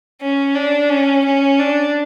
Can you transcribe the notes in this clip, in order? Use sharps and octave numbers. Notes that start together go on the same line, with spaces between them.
C#4
D4
C#4
C#4
D4